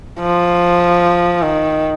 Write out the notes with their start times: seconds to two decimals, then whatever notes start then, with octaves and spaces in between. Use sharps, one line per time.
0.20 F3
1.42 D#3